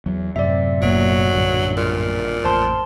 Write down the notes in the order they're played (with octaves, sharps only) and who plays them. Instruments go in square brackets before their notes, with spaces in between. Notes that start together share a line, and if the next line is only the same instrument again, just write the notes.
[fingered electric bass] E2 [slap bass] F#3
[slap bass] F#2 A2 [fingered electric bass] C3 [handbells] D5 E5
[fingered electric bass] F#1 B2 A#3 [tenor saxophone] F#3
[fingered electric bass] A#1 G2 D3
[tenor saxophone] A#2
[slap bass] A1 F2 [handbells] C5 A5 C6